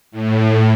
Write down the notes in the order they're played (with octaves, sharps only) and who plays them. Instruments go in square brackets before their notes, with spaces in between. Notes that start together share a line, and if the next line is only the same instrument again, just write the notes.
[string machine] A2